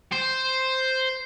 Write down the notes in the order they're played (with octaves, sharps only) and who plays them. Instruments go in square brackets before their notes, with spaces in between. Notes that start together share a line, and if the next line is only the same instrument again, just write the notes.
[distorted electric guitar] C5